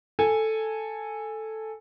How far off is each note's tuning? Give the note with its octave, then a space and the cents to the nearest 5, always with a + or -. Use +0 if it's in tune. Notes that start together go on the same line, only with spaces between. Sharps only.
A4 +0 G#5 -5